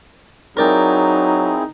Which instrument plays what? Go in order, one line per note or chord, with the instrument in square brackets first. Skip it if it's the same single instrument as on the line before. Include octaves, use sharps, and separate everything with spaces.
[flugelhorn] F#3 [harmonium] C4 E4 G#4 [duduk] D#4 [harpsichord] A#4 D5 G5